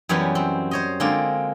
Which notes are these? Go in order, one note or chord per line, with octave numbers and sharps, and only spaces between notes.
F#2 E3 G3 B3 C#4 E4
C4
C5 C#5 D#5
D3 G#3 A#3 C4 F4 D5